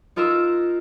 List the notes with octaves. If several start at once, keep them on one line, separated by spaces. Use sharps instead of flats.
D#4 F4 A#4 A#5 E6